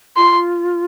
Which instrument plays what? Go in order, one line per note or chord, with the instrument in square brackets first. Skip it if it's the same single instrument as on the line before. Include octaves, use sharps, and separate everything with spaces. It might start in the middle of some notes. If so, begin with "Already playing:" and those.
[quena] F4 [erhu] C6